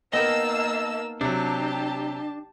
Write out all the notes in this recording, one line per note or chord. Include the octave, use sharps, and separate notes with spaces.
A#3 B3 D#4 D#5 G5 A5 E6
C3 F#3 D4 G4 A5